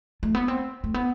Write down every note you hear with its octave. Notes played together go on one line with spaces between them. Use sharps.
A3
B3
C4
A3
B3